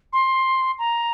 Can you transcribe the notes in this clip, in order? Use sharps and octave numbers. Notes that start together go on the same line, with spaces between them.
C6
A#5